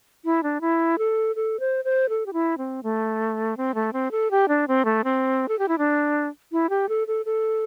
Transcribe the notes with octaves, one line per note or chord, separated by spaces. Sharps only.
E4
D4
E4
A4
A4
C5
C5
A4
G4
E4
C4
A3
C4
A3
C4
A4
G4
D4
C4
A3
C4
A4
G4
E4
D4
E4
G4
A4
A4
A4